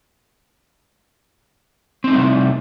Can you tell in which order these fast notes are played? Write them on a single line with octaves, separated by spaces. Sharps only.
C4 D#4 A3 G3 C3